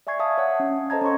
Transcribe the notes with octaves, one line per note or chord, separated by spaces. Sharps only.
D5 E5 G#5 C#6 G#6 C7
E5 F5 A5 D#6
C#5 F#5
C#4
A4 C5 D#5 A5 A#5 G#6
C#4 C#5 C6 C#6